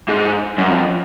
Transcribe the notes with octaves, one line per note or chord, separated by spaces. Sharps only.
G#2
F#2
F2